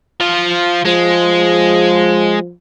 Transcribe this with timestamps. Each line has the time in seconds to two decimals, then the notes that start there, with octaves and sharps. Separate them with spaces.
0.20 F3 F4
0.85 F3 G#3